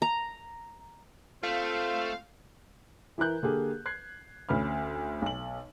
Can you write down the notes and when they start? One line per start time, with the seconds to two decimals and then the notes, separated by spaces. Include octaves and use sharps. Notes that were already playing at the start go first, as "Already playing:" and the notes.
0.02 A#5
1.43 A3 C4 F4 C5 F5
3.18 E3 E4 A#4 F#6 G6
3.43 D3 A#3 G4 G#4
3.86 F#6 G#6 C7
4.49 D2 C#4 B5 F6
5.22 B1 F#7